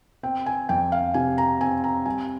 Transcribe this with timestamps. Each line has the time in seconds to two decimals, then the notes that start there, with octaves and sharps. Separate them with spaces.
0.23 C4 G5
0.46 G#5
0.69 F2 G5
0.92 F5
1.14 C3 G#5
1.38 A#5
1.60 C4 G#5
1.84 A#5
2.06 G3 G#5